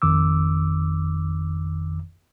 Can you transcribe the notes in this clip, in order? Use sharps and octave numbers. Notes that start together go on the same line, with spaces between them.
G#1 F2 D#3 D6 E6